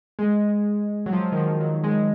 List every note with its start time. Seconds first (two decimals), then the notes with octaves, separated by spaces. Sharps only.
0.19 G#3
1.06 F#3
1.13 F3
1.32 D#3
1.37 F3
1.61 F#3
1.84 G#3